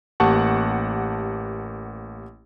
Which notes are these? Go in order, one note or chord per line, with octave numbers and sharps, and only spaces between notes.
A1 A#3 G4 F#5 A5 C#6